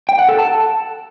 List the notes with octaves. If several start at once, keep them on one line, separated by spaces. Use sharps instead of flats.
G5
F#5
A4
A5